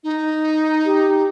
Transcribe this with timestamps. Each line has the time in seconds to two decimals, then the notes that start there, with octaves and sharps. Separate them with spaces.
0.04 D#4
0.85 G4